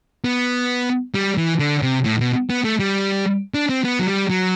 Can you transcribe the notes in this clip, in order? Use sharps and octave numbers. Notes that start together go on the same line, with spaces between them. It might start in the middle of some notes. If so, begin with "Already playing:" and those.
B3
G3
E3
D3
C3
A2
B2
B3
A3
G3
D4
C4
B3
F#3
G3
F#3